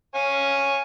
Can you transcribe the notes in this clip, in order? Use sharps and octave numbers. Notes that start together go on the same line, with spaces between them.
C#5 F5 G#5